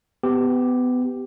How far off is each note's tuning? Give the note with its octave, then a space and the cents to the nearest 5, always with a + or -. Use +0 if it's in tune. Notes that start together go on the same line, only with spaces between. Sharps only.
B3 +25 G4 +0